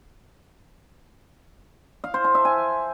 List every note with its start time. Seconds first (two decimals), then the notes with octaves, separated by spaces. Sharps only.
2.04 F5
2.14 C5
2.24 A5
2.35 E5
2.45 G#5